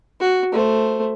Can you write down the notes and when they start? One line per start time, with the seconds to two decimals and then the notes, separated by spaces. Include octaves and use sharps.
0.20 F#4
0.52 A3 C5